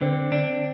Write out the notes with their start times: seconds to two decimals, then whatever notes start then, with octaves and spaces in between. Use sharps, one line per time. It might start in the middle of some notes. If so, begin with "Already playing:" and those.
0.01 D3 C4
0.32 D4